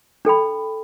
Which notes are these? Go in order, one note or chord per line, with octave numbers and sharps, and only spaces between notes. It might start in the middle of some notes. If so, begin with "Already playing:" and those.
D4 A4 G5 B5